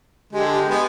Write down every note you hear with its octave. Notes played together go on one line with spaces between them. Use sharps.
D3 G#3 G4
G4
G#3 B3